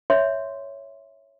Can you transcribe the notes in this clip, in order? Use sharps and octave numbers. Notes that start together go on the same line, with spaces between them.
C#5 E5 C6